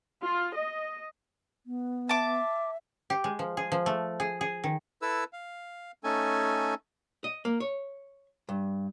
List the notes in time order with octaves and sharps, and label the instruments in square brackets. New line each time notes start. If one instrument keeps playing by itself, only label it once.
[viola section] F4
D#5
[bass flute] B3
[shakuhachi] E5 [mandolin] A5 D6
[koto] G4
G#3
F3
G#4
F3
A3
G#4
G#4
D#3
[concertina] E4 A4 B4 E6
F5
A3 C#4 D#4 A4 G#5
[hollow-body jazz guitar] D#5
A#3
C#5
G2